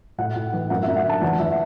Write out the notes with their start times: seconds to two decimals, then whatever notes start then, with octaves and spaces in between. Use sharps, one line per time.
0.18 A2 F#5
0.35 A2
0.53 E3
0.70 F#2 F#5
0.83 E5
0.88 F#2
0.96 F#5
1.04 D3 A5
1.21 E2 F#5
1.39 E2 E5